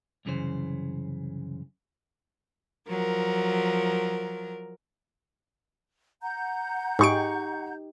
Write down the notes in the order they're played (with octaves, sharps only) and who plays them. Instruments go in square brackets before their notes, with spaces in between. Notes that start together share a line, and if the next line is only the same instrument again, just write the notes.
[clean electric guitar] C2 F#2 C#3 E3 C5
[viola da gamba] F3 F#3 A#4
[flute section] F#5 A#5 G6
[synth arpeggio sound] G#2 D7 [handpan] D#4 G4 [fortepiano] G#4 C#6